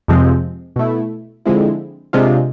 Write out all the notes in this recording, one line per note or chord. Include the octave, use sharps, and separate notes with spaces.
F2 C3 F3 G#3 C4
B2 A3 E4
D3 F3 G#3 C4 E4
C3 G#3 D4 F4